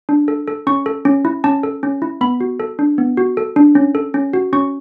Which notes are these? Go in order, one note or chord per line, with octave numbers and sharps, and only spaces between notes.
D4
A4
A4
C#4 C#6
A4
C#4
E4
C#4 A5
A4
C#4
E4
B3 B5
F#4
A4
D4
B3
F#4
A4
D4
C#4
A4
C#4
F#4
C#4 C#6